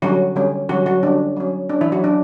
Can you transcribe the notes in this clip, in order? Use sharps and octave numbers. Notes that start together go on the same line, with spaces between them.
D3 F#3 G3 C#4 F#4
D3 G3 C#4
D3 F#3 G3 C#4 F#4
F#3 F#4
D3 G3 C#4 D4
F#3 C#4
F#3 C#4 D4
E3 E4
F#3 F#4
F#3 C#4 D4